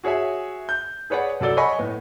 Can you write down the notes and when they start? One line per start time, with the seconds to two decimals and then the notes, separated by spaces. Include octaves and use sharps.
0.04 F#4 G#4 C#5 E5 G#5
0.69 G6
1.10 G#4 B4 C#5 D5 F#5
1.40 C2 F#3 A4 D5 E6 G7
1.57 C#5 D#5 F#5 G#5 B5 C#6
1.79 A2 B3